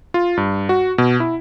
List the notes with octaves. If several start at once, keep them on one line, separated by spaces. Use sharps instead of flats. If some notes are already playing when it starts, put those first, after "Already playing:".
F4
G2
F#4
B2
E4